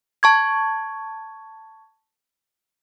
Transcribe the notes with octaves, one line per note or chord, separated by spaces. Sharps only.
A5 C#6 G#6